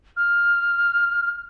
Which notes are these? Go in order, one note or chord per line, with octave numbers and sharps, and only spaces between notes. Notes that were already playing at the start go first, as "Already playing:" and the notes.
F6